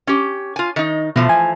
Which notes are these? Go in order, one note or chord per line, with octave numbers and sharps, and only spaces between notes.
C#4 G4
F4 G#5
D#3 D#4
B2 E3 F3 A3
G#5